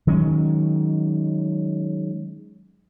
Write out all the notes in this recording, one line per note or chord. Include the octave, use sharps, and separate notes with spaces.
D#3 F#3 G#3 C#4